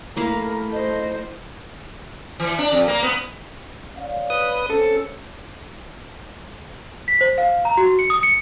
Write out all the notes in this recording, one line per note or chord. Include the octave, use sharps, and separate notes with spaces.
A3 A#3 E4 A#4 F5
C5 D#5
E3
D4
F2
A#3
B3
C#4 D5 F5
B4 D#6
C4 C#4 A4
B6
C5
F5
A#5
F#4
C#7
D#6
C#7